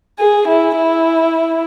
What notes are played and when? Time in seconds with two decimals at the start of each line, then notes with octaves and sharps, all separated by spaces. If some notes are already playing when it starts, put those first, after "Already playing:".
0.19 G#4
0.48 E4
0.76 E4